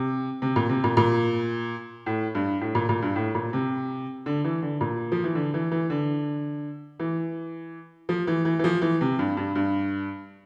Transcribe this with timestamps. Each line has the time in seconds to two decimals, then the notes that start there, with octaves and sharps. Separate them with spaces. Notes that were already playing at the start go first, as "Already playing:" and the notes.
Already playing: C3
0.42 C3
0.56 A#2
0.69 C3
0.84 A#2
0.97 A#2
2.06 A2
2.35 G2
2.61 A2
2.75 A#2
2.89 A#2
3.02 G2
3.16 A2
3.35 A#2
3.53 C3
4.26 D3
4.44 E3
4.62 D3
4.81 A#2
5.12 F3
5.24 E3
5.35 D3
5.54 E3
5.71 E3
5.90 D3
7.00 E3
8.09 F3
8.27 E3
8.45 E3
8.59 E3
8.64 F3
8.82 E3
9.01 C3
9.19 G2
9.37 G2
9.55 G2